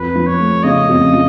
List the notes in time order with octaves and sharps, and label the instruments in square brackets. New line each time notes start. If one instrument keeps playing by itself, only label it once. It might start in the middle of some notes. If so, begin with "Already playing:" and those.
Already playing: [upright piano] F2 [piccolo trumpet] B4
[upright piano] F3
[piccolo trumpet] C#5
[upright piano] A3
[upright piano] C#3 [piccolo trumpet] D#5
[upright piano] F2
F3